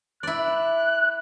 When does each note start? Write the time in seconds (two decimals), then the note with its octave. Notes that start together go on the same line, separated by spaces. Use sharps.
0.23 E4 D5 F#6